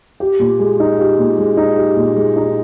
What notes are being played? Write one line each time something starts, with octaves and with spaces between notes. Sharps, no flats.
G4
A#2
G#3
D#4
G4
A#2
G#3
D#4
G4
A#2
G#3
D#4